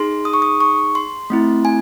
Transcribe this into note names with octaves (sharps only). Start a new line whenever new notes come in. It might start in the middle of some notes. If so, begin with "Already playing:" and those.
Already playing: D#4 G#4 C6
D#6
C#6
D#6
C#6
C6
A3 C4 E4
G#5